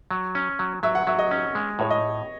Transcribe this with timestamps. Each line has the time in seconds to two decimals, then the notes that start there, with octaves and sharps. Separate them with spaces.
0.11 F#3
0.35 C#4
0.59 F#3
0.83 F#3 E5
0.95 F#5
1.07 F#3 E5
1.19 D#5
1.31 C#4
1.55 G#3
1.79 A2 C#5
1.90 D#5